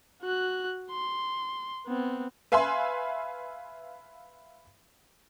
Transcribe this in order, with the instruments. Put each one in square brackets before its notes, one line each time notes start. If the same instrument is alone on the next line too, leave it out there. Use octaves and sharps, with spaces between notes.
[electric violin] F#4 F#6
C6
B3 C4
[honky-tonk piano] B4 E5 F5 G#5 B5 C6